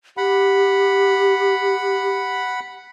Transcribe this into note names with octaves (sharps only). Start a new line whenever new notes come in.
G4 F#5 B5